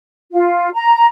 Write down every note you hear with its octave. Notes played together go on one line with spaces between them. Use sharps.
F4
A#5